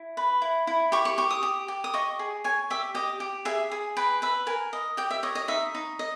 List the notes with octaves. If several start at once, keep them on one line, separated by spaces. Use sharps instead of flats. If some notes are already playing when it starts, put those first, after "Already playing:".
Already playing: E4
B4
E4
E4
G4 C#6
C#6
G4 C#6
D#6
G4
G4
D#6
D#5 C#6
G#4
C#5 G#5
G4 E5
G4 D#5
G4
G#4 E5
G#4
B4 G5
B4 E5
A#4 G#5
D#5
G4 G5
E5
C#5 D#5
D#5
D#4 E5
D#4
D#5